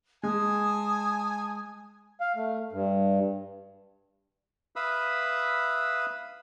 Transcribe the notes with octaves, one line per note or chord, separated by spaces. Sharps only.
G#3 G#5 A5 D#6
F5
A3
G2
B4 E5 F5 B5 D#6 E6